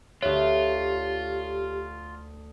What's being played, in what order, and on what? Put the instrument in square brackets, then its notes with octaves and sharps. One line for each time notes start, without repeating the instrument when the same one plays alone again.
[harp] D2 E5 [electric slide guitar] F4 [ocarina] G4 [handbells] C#5